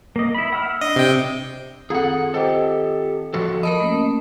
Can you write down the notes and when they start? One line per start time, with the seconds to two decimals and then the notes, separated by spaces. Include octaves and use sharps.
0.16 A#3 D#5
0.35 E4 B5
0.52 F#5 E6 F6
0.81 D4 D#5
0.96 C3 G5
1.90 D#3 C4 F4 G#4 A4 F#5
2.34 G4 A4 C5 D#5 G5
3.34 F3 F#4 A4
3.63 A#4 D#5 A5 B5
3.80 A3 A#3 C#4